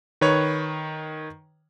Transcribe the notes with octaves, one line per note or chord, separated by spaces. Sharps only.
D#3 B4 C#5